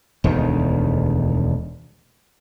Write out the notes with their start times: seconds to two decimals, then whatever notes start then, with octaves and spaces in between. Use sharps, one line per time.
0.24 E1 D2 D#3